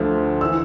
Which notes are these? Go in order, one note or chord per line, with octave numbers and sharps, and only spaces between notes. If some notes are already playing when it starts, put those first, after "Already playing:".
Already playing: D2 D3 F3
E3 E6